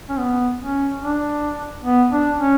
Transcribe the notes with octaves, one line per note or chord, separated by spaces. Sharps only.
C#4
B3
C#4
D4
B3
D4
C#4